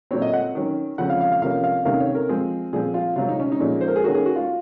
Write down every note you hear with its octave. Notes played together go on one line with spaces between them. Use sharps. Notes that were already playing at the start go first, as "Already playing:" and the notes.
A#2 F#3 C4 C#5
D#5
F#5
D#3 F#3 C#4
C#3 F3 C4 F#5
F5
F5
F5
C3 F3 A#3 C#4 F5
F5
C3 D#3 A#3 C#4 F5
C#5
A#4
F3 G#3 C4 G#4
A#2 F3 C4 G#4
F4
C3 F#3 C4 F4
D#4
C#4
D#4
A#2 F3 G#3 C#4
C5
A#4
G#4
D#3 A#3 C#4 F#4
G#4
F#4
F4